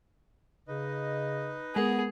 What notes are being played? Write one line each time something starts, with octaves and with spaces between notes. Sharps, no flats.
C#3 D#4 B4 D#5
G#3 B3 G#4 A#4 F#5